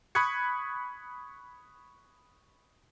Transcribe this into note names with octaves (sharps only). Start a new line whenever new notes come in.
B5 C#6 D#6 F#6 G#6 C#7